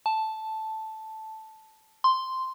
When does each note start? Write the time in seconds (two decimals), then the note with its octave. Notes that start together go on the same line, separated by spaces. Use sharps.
0.06 A5
2.04 C6